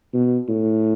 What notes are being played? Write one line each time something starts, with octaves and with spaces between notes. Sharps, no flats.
B2
A2